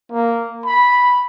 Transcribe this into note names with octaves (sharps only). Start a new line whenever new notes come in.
A#3
B5